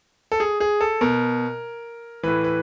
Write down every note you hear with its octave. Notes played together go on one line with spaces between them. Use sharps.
A4
G#4
G#4
A4
B2 A#4
A2 E3 B4
B4